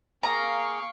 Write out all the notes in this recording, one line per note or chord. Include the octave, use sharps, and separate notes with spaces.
A#3 G#4 A#4 F5 G5 A#5 C#6